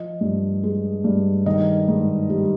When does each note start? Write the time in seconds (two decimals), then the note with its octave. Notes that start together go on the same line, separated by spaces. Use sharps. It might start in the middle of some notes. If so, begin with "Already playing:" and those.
Already playing: F3 D#5
0.21 G2
0.63 G#3
1.04 G2
1.46 D#3 D#5
1.88 G#2
2.30 G3